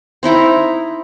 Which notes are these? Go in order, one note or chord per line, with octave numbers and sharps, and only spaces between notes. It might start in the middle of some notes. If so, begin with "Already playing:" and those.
C4 D#4 E4 A#5